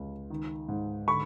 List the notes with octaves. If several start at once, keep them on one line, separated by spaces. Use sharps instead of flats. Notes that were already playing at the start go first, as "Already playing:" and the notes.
Already playing: C#2 C#3
D#3
G#2
D3 B5 C#6